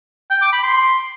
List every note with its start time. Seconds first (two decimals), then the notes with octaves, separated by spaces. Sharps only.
0.30 G5
0.41 D6
0.52 B5
0.63 C6